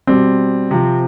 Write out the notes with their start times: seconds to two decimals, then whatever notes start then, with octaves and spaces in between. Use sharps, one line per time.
0.07 B2 G3 C4
0.71 C3 F3